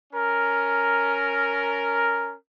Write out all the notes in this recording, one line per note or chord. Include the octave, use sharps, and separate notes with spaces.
C#4 A#4